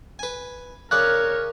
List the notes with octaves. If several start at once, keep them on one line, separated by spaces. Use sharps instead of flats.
B4 G#5
C#3 C#4 A#4 C#5 D5 F#6